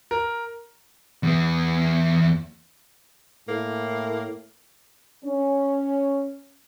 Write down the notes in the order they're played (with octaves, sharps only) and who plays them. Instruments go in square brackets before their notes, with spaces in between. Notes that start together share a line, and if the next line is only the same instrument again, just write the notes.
[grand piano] A#4
[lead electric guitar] E2 B3
[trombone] A2 [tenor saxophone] A#3
[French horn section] C#4